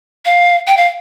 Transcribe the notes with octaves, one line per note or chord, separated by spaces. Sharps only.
F5
G5
F5